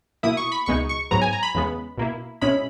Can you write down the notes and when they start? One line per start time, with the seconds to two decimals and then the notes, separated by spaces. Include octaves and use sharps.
0.23 B2 A#3 E4 D#6
0.37 C#6
0.52 B5
0.66 C#2 B2 G#3 D#4 C#6
0.89 C#6
1.11 G#2 F#3 B3 A#5
1.21 G#5
1.33 A#5
1.43 B5
1.55 E2 C#3 G#3 B3
1.98 B2 A#3 E4
2.41 B2 G#3 C#4 E4 B5